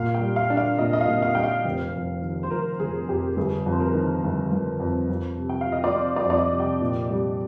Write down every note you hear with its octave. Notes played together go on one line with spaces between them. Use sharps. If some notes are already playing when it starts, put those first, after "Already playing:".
Already playing: A#2 F5
G5
G3
F5
D4
F5
A#2 D#5
D#5
F5
A#2
F5
G3 G5
F5
F1
F2
D#3
C5
F1 A#4
F1 G#4
F2 G4
G1 G#4
F2
C5
A#4
D#3
G1
G1
F2
F2
C3
G5
F5
F3
D#5
D5
C4 C5
D5
F2
D5
D#5
C3
G5
A#2
G3